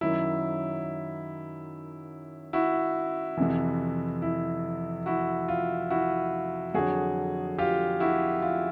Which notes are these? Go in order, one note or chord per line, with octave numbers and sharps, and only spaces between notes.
F#2 D#3 F#3 E4
E4 F#4
F2 C3 E3
E4
E4 F#4
F4
E4 F#4
F2 D3 F#3 F#4 G#4
F4 G4
E4 F#4
F4